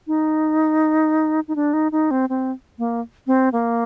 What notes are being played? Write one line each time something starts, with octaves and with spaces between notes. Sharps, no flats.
D#4
D#4
D4
D#4
D#4
C4
C4
A#3
C4
A#3